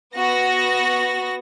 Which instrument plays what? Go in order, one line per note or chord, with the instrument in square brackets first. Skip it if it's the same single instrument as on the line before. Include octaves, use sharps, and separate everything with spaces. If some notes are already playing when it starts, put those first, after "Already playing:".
[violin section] B3 F#4 A#6